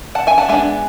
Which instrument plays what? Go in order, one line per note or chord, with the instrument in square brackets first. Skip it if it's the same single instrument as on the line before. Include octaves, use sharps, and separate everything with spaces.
[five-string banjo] F#5 A5
E5 G#5
F#5 A5
G#3 B3 D4 E5 G#5